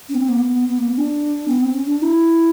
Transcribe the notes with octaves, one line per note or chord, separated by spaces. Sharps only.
C#4
B3
C4
A#3
B3
B3
A#3
B3
D4
B3
C4
C#4
D4
E4